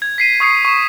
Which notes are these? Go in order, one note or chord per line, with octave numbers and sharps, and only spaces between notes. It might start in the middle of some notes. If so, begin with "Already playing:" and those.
G#6
B6 C7 D#7
C#6 D#6 G#6 C7 C#7
C#6 E7